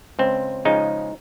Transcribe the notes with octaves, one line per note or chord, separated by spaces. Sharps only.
C#2 C4
C#3 F3 G#3 D#4